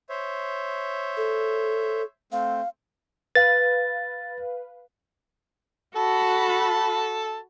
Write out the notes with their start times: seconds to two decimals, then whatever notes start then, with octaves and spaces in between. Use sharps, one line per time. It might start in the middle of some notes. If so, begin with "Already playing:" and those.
0.09 C5 C#5 E5
1.17 A4
2.32 A3 C4 F5
3.35 B4 F5 A6
5.96 F#4 A4 A5 B5